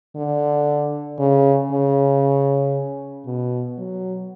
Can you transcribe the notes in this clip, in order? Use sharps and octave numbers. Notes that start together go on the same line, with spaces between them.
D3
C#3
C#3
B2
F#3